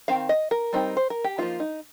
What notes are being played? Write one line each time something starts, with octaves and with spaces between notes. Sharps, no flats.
D#3 C4 F5
D#5
A#4
G3 C4 D#4
C5
A#4
G4
F3 A#3 D#4 F4
D#4